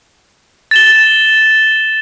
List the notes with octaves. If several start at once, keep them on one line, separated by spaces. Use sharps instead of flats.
A6 E7 G7